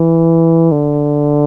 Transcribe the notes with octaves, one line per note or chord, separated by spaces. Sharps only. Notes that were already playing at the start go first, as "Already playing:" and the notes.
Already playing: E3
D3